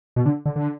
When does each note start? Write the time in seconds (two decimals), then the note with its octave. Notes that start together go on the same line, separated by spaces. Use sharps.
0.16 B2
0.26 D3
0.46 D3
0.56 D3